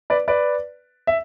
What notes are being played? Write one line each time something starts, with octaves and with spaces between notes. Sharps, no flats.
B4 D5
B4 D5
E5